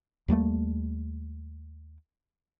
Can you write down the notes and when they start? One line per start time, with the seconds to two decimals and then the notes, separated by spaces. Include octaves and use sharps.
0.28 D#2 G3 A3 A#3